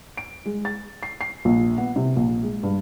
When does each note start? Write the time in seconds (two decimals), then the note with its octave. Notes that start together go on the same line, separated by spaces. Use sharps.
0.17 D7
0.46 G#3
0.65 A6
1.03 C7
1.21 C7
1.45 A#1
1.78 B3
1.96 C3
2.16 A#1
2.43 G#3
2.63 G2